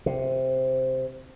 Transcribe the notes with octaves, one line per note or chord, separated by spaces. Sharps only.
C3